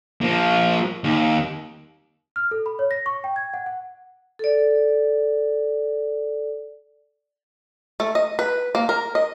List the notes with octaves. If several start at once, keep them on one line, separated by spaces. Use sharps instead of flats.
F3 A#3
D#2
F6
A4
B5
C#5
A#6
C#6
G5
G#6
F#5
F#5
A4 D5
A3
D#5
B4
A#3
A#4
D#5